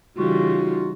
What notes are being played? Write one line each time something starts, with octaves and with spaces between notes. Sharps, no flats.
C#3 E3 G3 D#4 F4 F#4